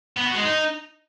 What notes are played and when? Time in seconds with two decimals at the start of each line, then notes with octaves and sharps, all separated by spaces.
0.17 B3
0.26 F#4
0.34 G#3
0.43 D#4